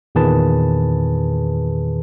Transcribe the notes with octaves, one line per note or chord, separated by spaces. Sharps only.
E2 A#2 D#3 G#4 B4 A5